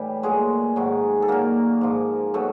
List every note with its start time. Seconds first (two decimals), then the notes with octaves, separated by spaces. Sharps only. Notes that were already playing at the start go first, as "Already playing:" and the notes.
Already playing: A2 E3 G3 G4
0.23 A#2 F#3 G#3 G#4
0.76 G#2 D#3 F#3
1.22 A4
1.28 A#2 F#3 A#3 A#4
1.81 G#2 F3
2.34 B2 F#3 A3 A4